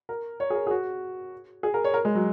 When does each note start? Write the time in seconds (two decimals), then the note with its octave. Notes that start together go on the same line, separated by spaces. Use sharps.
0.09 A#4
0.40 C#5
0.50 G#4
0.55 A#4
0.67 G#4
0.71 F#4
1.63 G#4
1.74 A#4
1.85 C#5
1.94 A#4
2.05 G#3
2.15 F#3